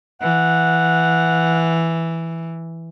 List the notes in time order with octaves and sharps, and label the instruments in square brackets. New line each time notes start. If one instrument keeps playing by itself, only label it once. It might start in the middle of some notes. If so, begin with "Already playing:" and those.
[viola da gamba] E3 [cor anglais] F#5